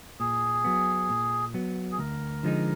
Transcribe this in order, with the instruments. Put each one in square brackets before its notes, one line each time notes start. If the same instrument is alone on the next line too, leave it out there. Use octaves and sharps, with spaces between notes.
[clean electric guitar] A#2 [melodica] G#4
[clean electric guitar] F#3 B3
A#2
F#3 B3
[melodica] G#4
[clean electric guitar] D2 [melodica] A#4
[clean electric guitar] D3 F3 G#3 D#4